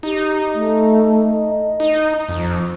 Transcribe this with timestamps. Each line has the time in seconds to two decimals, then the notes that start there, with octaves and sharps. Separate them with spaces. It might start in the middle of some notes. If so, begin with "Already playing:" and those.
0.03 D#4 G4
0.54 A3
1.34 D#5
1.80 D#4
2.29 F2 F3